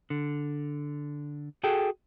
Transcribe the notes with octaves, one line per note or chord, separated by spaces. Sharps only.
D3
F#4 G#4 A4 G5 A5